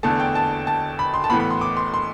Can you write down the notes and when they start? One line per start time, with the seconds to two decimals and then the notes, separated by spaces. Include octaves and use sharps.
0.03 E2 D3 A3 A5
0.19 G5
0.35 A5
0.67 A5
0.99 B5
1.14 C6
1.24 A5
1.30 A2 E3 B3 B5
1.40 B5
1.50 C6
1.61 D6
1.77 C6
1.94 C6